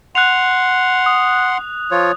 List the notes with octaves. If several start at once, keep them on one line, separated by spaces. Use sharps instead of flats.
F#5 C6 F#6 F7
D#6
F3 F4 C#5